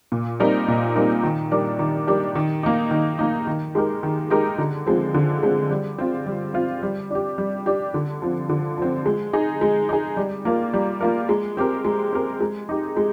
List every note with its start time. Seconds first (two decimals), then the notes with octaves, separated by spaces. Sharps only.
0.12 A#2
0.40 G3 C4 D#4 A#4
0.68 A#2
0.96 G3 C4 D#4 A#4
1.24 D#3
1.52 G3 D4 G4 A#4
1.79 D#3
2.07 G3 D4 G4 A#4
2.35 D#3
2.63 A#3 D#4
2.91 D#3
3.19 A#3 D#4
3.47 D#3
3.75 G#3 D#4 G4 A#4
4.03 D#3
4.30 G#3 D#4 G4 A#4
4.58 D3
4.86 F3 G#3 C4
5.14 D3
5.43 F3 G#3 C4
5.70 G3
5.98 C4 F4
6.26 G3
6.54 C4 F4
6.83 G3
7.10 D4 G4
7.38 G3
7.66 D4 G4
7.94 D3
8.22 F3 C4
8.49 D3
8.78 F3 C4
9.06 G#3
9.33 D#4 G#4
9.61 G#3
9.89 D#4 G#4
10.17 G3
10.45 A#3 F4 A#4
10.73 G3
11.01 A#3 F4 A#4
11.29 G#3
11.57 C4 G4 A#4
11.85 G#3
12.13 C4 G4 A#4
12.40 G#3
12.69 D#4 G4
12.97 G#3